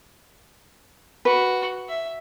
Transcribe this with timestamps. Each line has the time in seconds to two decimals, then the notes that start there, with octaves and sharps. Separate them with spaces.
1.25 F#4 B4
1.89 E5